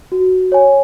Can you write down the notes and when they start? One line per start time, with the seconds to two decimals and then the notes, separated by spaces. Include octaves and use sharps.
0.12 F#4
0.52 C#5 G#5